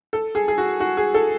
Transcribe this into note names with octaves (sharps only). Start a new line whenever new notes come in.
A4
G#4
G#4
F#4
F#4
G#4
A4